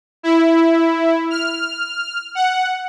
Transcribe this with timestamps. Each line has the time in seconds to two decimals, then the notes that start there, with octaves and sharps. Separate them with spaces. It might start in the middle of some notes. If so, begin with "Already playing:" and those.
0.23 E4
1.30 F6
2.35 F#5